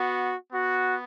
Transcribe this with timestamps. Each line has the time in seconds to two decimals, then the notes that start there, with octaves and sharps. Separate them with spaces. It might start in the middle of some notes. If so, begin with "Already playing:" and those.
Already playing: B3 F#4
0.53 B3 F#4